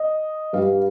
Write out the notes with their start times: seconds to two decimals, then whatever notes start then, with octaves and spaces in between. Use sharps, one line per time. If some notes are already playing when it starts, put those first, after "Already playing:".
Already playing: D#5
0.53 G2 G3 F5